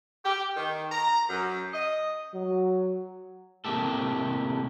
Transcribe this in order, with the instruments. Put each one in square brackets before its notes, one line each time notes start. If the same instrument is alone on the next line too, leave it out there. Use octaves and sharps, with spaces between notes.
[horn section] G4
D#3
A#5
F#2
D#5
[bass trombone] F#3
[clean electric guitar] A2 C3 F#3 A#3 G4 A4